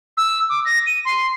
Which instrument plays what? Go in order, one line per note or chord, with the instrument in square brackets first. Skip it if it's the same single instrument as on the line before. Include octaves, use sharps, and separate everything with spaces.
[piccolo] E6
D6
A#6
D#7
C6